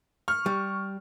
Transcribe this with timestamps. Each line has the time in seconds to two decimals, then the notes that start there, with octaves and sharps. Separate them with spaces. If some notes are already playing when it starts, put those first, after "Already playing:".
0.28 C#6 F6
0.46 G3